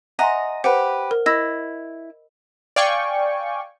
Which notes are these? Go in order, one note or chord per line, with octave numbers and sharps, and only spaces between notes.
D#5 E5 F#5 G#5 A#5 C6
G4 B4 C5 F#5
A#4
E4 D#5 E6 A#6
D5 F5 G5 G#5 C#6